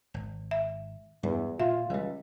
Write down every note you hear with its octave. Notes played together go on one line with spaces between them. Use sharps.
G#1
E5
E2 G2
A#2 F4 E5
C#2 E3 G3